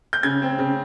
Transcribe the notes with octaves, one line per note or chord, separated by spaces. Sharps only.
G6
C#3 G#6
C4
C#3